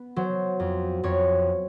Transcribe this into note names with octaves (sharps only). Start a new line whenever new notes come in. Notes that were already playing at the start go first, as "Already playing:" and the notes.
Already playing: B3
F#3 C5
F2
F2 C#5